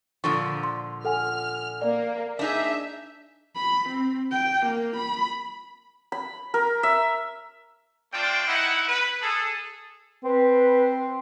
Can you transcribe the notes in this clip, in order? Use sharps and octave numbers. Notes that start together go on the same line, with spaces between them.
A#2 D3 F3 C#6
C6
A4 F#5 G#5 F6
A#3 D5
D4 D#4 G#4 E5
B5
C4
G5
A#3
B5
B5
A#4
E5
A3 C4 D4 F4 D5 G5
D#4 E4 F#5
B4
G#4 A4
C4 B4